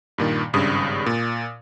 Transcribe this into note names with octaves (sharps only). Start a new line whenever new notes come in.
G2 A#2 D#3
G#1 G2 C#3 D#6
A#2